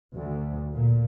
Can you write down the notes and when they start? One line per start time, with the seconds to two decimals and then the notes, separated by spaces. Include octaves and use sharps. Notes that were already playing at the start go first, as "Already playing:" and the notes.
0.14 D2
0.73 A#2